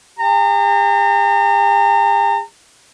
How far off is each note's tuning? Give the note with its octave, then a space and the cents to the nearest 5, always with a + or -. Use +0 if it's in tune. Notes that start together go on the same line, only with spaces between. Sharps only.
G4 +45 A#5 -40